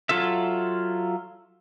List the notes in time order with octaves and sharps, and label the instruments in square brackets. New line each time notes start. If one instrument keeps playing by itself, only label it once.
[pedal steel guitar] F#3 F4 A4 E5